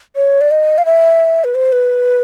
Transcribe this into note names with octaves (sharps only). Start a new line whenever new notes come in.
C#5
D5
D#5
F5
E5
B4
C5
B4